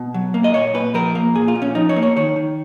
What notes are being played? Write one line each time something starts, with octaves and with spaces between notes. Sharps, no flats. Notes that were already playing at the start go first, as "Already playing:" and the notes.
Already playing: B2
F#3
A#3
D#5
A#2 C#5
A#2 B4
F3 A#4
A#3
A#2 G#4
F4
A#2
C#4
F3 D#4
C#5
A#3
C#5
D#3 C#5
D#3